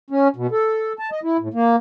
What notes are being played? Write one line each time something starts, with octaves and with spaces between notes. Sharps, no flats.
C#4
B2
A4
A5
D#5
E4
A2
A#3